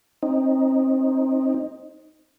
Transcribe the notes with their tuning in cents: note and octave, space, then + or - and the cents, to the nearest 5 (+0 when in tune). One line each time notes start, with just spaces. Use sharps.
C4 +25 D#4 +0